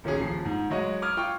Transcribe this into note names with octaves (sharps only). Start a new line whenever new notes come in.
D#1 B1 C#4 G#4
D#1 F3 C7
G#2
F#3 G#3 C#5 D#5
D6 D#6 F6 G#6
F4 G5 C#6